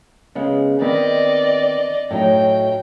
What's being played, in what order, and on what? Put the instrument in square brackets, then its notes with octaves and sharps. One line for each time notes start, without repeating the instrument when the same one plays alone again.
[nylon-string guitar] C#3 G#3 B3
[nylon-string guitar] D#3 B3 C4 [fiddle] D5 D#5
[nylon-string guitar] A2 F#3 D#4 [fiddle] G5